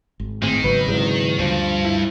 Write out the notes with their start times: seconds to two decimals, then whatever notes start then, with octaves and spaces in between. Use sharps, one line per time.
0.20 G#1
0.42 A2 D#3 C4 G#4
0.64 G#1 C#3 F#3 B3 B4
0.88 E2 G#2 C3
1.39 D2 G2 F3
1.85 E4